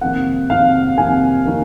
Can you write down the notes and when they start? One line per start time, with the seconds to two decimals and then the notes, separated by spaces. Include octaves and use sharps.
0.01 F2 C3 D#3 A#3 F#5
0.50 F2 C3 D#3 A#3 F5
0.97 F2 C3 D#3 A#3 G#5
1.46 C3 D#3 A#3